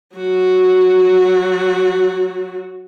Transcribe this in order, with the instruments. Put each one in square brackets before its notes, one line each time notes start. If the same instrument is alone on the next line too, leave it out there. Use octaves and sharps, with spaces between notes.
[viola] F#3 F#4